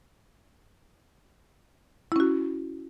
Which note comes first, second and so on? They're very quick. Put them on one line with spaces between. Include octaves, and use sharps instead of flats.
E4 C#4 F#4